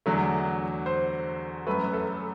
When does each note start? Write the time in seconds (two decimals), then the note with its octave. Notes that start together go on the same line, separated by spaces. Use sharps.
0.06 E2 D3 F#3 A3
0.86 C5
1.67 F#2 F#3 A3 B4
1.84 B4
1.93 A4